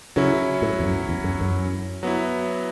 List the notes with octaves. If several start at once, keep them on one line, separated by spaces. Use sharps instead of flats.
C#3 F#3 C#4 E4
A2
E2
F#2
E2
F#2
F#2
F#3 B3 E4